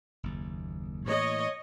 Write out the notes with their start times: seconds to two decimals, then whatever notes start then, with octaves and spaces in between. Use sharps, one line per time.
0.23 F#1 D#2
1.06 A2 E3 A#3 C#5 D#5